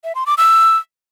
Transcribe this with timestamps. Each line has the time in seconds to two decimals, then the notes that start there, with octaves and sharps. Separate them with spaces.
0.04 E5
0.15 C6
0.26 D6
0.38 E6